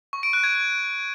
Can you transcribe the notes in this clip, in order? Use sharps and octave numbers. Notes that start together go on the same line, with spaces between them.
C#6
D7
F#6
G#6